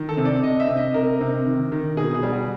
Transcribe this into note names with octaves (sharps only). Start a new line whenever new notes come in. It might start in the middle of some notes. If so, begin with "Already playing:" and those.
Already playing: D#3
A4
C3
D5
C3 D#5
E5
C3
D#5
C3 A#4
C3
D#3
D#3
B2 G#4
G#4
G3
F#4